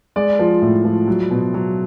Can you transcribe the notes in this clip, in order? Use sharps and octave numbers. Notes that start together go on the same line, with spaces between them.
G#3 D5
F3
A2
F3
F#3
B2
F#3